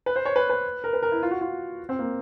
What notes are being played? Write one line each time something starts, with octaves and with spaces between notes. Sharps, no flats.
B4
C5
C#5
B4
B4
A#4
B4
A#4
E4
F4
F#4
F4
C4
A#3